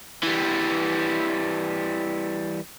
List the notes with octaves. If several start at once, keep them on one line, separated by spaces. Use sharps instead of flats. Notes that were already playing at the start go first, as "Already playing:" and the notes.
E3 G3